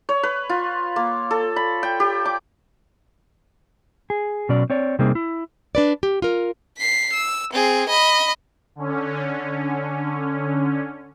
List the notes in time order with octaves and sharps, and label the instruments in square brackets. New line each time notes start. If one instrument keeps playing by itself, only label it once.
[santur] C#5
B4
F4
A#3
A4
B5
G5
G4
D6
[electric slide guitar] G#4
B2 F#3 C#4 D5
C4 C#5 D5
C3 G3 A#3 C4 D#4 G#4
E4
[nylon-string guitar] D4 B4 D5
G4
F4 A#4
[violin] B6 C7
E6
C4 G#4
D#5 B5
[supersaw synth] D3 C#4